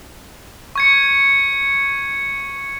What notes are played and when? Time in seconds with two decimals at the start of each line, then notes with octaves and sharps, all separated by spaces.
0.75 C#6 G#6 C#7